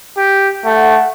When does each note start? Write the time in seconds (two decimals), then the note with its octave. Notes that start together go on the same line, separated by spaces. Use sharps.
0.18 G4
0.65 A3 F#5